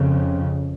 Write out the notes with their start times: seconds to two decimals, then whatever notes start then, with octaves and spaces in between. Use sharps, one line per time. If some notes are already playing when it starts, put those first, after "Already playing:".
Already playing: F2 C#3